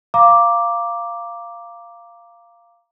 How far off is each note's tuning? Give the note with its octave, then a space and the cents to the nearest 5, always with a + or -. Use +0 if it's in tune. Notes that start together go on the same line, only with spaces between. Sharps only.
F5 -10 A#5 +5 D6 +0